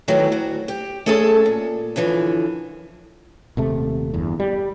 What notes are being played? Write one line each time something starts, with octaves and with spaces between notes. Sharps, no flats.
E2 D#3 E3 F#3 A3
D2 F#4
G4
A3 C#4 G#4 A4 D#5 A5
A#2
F#2 D3 E3 F3
D#1 C3 A3
G1 E2
G3